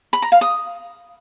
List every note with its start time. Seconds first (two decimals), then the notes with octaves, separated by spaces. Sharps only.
0.13 B5
0.22 A#5
0.32 F5
0.41 D#6